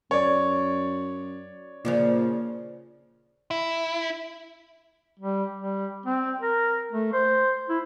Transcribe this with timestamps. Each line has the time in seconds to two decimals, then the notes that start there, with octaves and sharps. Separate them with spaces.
0.11 F#2 C#5 D5
1.85 A#2 C#3 F3 D4
3.51 E4
5.20 G3
5.57 G3
6.06 C4
6.42 A#4
6.92 A3
7.13 C5
7.69 E4